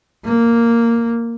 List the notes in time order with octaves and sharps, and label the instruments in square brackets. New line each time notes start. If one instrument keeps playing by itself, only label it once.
[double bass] A#3